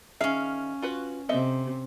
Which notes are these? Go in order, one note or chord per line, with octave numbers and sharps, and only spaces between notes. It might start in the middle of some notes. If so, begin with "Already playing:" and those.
D#3 C#4 G#4 E5 F5
F4 F#4 B4
C3 A4 D#5 E5